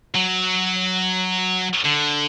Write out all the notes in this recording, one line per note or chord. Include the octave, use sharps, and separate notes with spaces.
F#3
D3